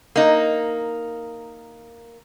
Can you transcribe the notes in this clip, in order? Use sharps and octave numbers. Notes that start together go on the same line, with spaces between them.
A#3 D#4